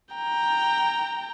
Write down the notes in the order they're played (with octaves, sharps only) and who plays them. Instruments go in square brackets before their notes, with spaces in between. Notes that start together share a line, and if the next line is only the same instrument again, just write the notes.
[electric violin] G5 A#5